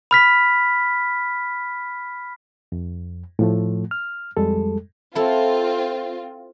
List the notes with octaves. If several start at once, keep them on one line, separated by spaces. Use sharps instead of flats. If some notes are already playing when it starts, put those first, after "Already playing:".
B5 F6 B6
F2
A2 F3 A3
F6
F2 G3 G#3 A4
C4 E4 F4 A4